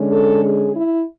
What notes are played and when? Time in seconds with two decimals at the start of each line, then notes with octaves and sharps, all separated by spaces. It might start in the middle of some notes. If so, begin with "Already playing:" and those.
Already playing: D3 G#3 C#4
0.12 A4
0.43 G#4
0.74 E4